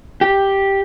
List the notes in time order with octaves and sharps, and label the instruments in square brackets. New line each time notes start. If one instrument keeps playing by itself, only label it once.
[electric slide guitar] G4